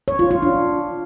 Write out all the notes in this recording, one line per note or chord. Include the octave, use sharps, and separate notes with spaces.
C#5
F4
F4
D4